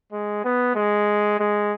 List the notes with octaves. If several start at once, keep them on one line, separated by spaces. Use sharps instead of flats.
G#3
B3
G#3
G#3